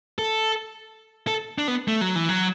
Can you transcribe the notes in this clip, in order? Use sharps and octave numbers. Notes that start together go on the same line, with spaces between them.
A4
A4
D4
B3
A3
F#3
E3
F#3